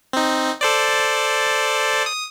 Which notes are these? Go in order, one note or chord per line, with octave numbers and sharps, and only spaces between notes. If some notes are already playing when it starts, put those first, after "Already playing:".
C4 D#4
A4 C5 D5
D#6